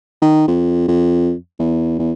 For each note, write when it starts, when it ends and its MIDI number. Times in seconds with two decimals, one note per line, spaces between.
0.22 0.47 51
0.48 0.84 41
0.88 1.34 41
1.59 1.98 40
1.99 2.12 40